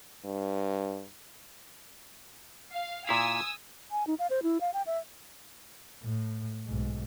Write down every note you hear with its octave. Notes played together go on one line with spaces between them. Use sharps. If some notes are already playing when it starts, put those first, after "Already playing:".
G2
F5
A#2 E4 F5 G#5 D#6 E6
G#5
D#4
F5
C5
E4
F5
G5
E5
A2
B1 G#2